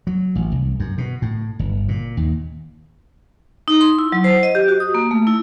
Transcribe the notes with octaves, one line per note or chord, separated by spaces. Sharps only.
F#3
A1
C2
F#2
B2
A2
G1
A#2
D#2
D#4
C6
E4
F#3
C5
D#5
G4
F#4
D#6
A#3
A3
E4